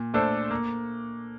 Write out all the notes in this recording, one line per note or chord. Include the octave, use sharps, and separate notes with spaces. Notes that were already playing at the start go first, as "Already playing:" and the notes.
Already playing: A#2
A3 D4 A4 C5
A#3